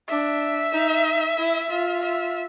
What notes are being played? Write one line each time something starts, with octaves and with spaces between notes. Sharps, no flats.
D4 E5
D#4
E4
F4
E5